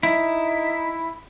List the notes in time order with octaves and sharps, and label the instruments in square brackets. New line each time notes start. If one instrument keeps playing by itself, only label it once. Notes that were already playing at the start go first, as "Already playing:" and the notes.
[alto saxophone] D#4 [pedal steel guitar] E4